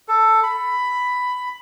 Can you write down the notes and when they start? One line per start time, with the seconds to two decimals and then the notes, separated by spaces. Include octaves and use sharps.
0.08 A4
0.43 B5